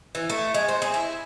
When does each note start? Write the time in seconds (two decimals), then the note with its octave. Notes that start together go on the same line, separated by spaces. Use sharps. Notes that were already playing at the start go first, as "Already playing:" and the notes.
0.15 E3
0.30 A3
0.54 G#3
0.69 C4
0.82 G#4
0.94 E4